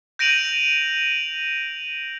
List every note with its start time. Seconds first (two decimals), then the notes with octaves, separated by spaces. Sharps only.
0.19 G6 A#6 D7 D#7 F7 F#7